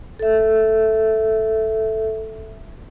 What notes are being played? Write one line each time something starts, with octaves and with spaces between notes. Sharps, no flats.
A4 E5